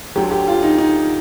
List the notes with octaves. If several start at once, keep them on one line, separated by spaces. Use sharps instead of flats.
D2 D3 F#3 G4
G4
F4
D#4
D#4